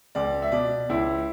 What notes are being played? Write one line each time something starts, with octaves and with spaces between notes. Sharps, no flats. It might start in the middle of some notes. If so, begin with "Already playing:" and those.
C#2 D5
E5
B2 D5
C#2 E4